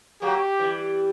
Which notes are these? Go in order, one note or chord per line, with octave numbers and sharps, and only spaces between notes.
F#3 A#3 G4
E3 G3